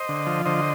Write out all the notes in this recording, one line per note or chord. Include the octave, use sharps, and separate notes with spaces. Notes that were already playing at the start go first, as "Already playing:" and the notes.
Already playing: C5 D#5
D3
F3
D3 C5 D#5